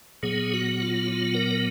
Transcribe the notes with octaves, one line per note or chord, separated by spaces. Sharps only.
A#2 F#3 B3 G#4
F#4
F4
F4
A#4